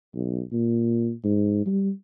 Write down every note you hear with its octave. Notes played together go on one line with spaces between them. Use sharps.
B1
A#2
G#2
G3